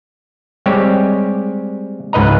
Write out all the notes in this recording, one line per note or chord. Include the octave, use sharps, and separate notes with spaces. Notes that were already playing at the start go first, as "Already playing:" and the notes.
G3 G#3 C4 G4 C#5
C#2 G#2 B4 D#5 A#5